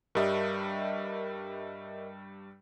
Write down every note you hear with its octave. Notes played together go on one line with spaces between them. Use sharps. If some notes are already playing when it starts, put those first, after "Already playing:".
G2 G3 A#4 D#5 E5